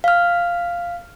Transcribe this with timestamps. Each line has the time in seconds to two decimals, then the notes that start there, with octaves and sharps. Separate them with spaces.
0.04 F5 F6